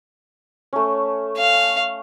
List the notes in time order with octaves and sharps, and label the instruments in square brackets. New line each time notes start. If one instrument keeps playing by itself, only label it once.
[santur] A3 C#4
[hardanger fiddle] F5